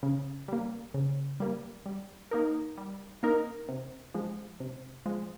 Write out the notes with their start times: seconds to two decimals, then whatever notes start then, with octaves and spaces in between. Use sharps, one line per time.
0.03 C#3
0.48 G3 A#3
0.94 C#3
1.40 G3 A#3
1.86 G3
2.31 A#3 D#4 A#4
2.78 G3
3.23 A#3 D#4 A#4
3.68 C3
4.14 F3 G#3
4.60 C3
5.06 F3 G#3